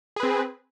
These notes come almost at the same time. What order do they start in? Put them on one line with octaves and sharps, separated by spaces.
G#4 B4 C4